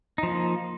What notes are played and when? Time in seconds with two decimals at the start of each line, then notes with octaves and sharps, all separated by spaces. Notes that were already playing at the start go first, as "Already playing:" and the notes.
0.18 D#4
0.23 F3
0.28 A#3